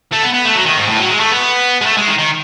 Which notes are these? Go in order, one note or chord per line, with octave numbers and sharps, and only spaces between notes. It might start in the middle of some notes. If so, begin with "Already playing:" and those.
A3
B3
B3
A3
F#3
D#3
G#2
A2
F#3
G#3
A3
B3
G#3
A3
G#3
D#3
D#3